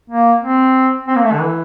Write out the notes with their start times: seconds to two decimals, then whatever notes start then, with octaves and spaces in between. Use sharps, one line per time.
0.10 A#3
0.42 C4
1.07 C4
1.16 A#3
1.24 A3
1.32 D3
1.40 E3